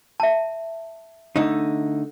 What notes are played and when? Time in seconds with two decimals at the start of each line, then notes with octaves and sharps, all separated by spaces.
0.20 E5 A5
1.36 D3 A3 D#4